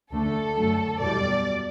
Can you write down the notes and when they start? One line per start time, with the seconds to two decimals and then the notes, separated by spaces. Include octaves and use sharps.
0.13 D2 D3 A3 A4
0.57 F#2 D3 F#3 A3
1.01 E2 B2 G3 D5